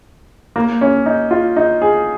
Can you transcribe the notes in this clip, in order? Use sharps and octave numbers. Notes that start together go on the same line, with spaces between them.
A#3
C#4
D#4
F4
D#4
G#4